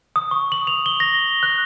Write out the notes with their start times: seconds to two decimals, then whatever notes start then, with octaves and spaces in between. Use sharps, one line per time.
0.16 D#6
0.31 C#6
0.52 F#7
0.67 F7
0.86 G7
1.00 A#6
1.43 F#6